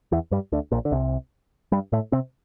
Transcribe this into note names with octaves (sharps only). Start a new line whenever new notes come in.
E2 E3
G2 G3
D2 D3
A#1 A#2
D3
C2 C3
G2 G3
A2 A3
C3 C4